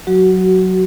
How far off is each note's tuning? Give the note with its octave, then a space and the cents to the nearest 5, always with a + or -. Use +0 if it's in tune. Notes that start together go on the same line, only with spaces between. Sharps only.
F#3 +0 F#4 +15